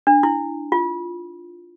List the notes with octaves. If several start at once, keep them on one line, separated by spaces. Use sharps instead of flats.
D4
E4
F4